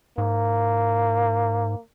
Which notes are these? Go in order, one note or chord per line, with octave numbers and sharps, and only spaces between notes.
G#2 A#3